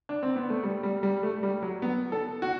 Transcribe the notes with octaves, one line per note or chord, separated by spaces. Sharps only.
D4
C4
B3
A3
G3
G3
G3
A3
G3
F#3
B3
A4
F#4